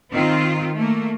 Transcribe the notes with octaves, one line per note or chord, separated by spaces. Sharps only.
D#3 C4 F4
A3 A#3